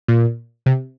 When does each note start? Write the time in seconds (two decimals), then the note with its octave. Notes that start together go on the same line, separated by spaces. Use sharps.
0.08 A#2
0.66 C3